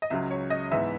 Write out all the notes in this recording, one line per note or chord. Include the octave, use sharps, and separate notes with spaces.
D#5
C#2 C#3 F#3 E5
C#5
D#5
G#2 E3 B3 E5